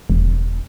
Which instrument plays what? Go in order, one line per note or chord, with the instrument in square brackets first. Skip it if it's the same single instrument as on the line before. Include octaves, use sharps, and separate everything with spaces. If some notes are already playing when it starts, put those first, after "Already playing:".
[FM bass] E1